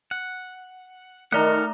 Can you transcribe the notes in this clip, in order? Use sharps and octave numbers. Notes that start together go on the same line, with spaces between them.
F#5
D#3 A3 A4 A#4 D5 F#5 A#5